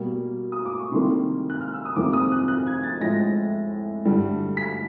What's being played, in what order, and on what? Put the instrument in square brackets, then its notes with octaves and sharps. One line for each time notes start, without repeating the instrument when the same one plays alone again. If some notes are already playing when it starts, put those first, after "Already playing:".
Already playing: [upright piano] B2 G3 A#3
D#6
D6
C#6
C3 D#3 G3 A#3 C6
F#6
F6
E6
D#6
F2 C3 D#3 G3 A#3 D6
D#6
F#6
F#6
G#6
A6
A2 F3 G#3 A#6
G2 D3 G3
B6